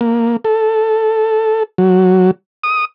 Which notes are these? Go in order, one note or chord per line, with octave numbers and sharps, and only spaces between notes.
A#3
A4
F#3
D#6